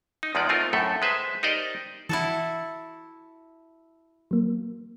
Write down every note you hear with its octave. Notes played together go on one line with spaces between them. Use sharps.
D#4
E2 F3 G#3 B3 D#4 D5
A3 C4 D#4 F4 A#4
F#2 A2 A3 A4 E5
G#3 B4 C5 E5
D#4 G4 A#4 C5 D5 D#5
E3 E4 F#4 A4
F#3 A#3